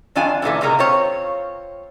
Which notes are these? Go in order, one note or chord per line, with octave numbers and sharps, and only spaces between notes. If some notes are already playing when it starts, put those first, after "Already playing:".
F#2 D#3 D4 F4 G#5
F#2 A#2 E3 A3
A2 C3 G#3 A#3 D#4 A#4
C4 F4 C#5